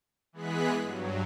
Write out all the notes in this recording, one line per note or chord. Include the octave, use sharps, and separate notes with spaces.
E3 G#3 B3 G#4 F#6 B6
G2 F#3